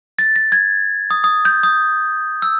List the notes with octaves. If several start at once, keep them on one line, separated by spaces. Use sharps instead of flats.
A6
A#6
G#6
D#6
D#6
G6
D#6
E6